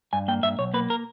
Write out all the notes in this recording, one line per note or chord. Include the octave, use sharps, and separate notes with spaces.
G2 G#5
A#3 G5
G2 E5
B1 C#5
A#3 B4
A#4